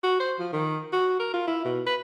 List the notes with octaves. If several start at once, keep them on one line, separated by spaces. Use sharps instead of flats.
F#4
C5
F3
D#3
F#4
A#4
F4
E4
B2
B4